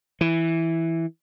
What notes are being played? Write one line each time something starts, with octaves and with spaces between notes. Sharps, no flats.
E3